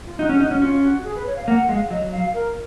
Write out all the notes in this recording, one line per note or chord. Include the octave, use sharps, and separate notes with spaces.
F4
D#4 F#4
C#4
G#4
D#4 F#4
C#4
C#4 F4
F#4
G#4
B4
C#5
F5
A#3 F#5
G#3 F5
F#3 D#5
F5
A#4